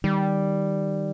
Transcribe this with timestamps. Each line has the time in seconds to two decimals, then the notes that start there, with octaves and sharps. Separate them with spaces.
0.04 D#3 G3